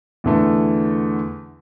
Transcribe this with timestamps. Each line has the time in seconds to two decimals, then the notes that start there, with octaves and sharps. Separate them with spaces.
0.24 E2 D3 A3